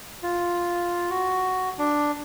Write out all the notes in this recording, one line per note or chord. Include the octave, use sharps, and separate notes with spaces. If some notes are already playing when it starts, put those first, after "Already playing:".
F4
F#4
D4